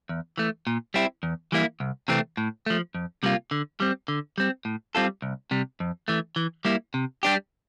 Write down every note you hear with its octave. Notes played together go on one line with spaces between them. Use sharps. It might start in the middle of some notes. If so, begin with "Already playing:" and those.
E2
E3 A3
A#2
G3 C4 E4
E2
E3 G3 A#3 E4
C2
C3 E3 A3 C4
A2
F3 A3
F2
C3 G3 A#3 F4
D3
G3 C4
D3
G3 C4
A2
G3 C4 F4 A4
C2
C3 G3
F2
E3 A3
E3
G3 A#3 E4
C3
G3 D4 G4